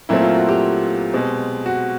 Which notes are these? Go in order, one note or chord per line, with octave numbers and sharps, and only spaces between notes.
A#2 F#3 A3 C4 E4
F4
F#4
G4
B2 G#3 C4
F#4